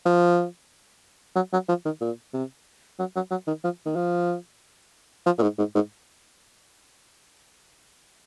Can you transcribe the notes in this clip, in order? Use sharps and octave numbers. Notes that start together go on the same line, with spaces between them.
F3
F#3
F#3
F3
D#3
A#2
C3
F#3
F#3
F#3
D#3
F3
D#3
F3
F3
A#2
G#2
G#2
G#2